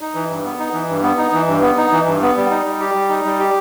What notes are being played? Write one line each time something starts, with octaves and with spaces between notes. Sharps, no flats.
D#4
E3
G2
B3
D#4
E3
G2
B3
D#4
E3
G2
B3
D#4
E3
G2
B3
G3
D#4
G3
G4
G3
D#4
G3
G4